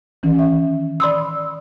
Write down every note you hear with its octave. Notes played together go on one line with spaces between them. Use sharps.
D#3 E3 C#4
E5
D5 B5 C6 D#6 E6